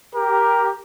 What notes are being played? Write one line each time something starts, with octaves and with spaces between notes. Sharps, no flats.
G4 A#4